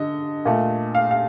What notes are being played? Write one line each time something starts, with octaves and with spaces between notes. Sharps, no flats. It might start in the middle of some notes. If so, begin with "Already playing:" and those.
Already playing: D3 D#5
A#2 A3
F5
F5